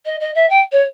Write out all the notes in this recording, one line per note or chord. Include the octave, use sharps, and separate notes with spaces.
D#5
D#5
E5
G5
C#5